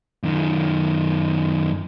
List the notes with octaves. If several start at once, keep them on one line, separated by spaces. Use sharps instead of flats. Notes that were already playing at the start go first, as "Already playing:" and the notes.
F#2 D#3